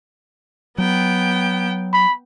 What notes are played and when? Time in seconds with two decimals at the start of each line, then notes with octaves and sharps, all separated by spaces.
0.78 F#3 B3 G5
1.93 B5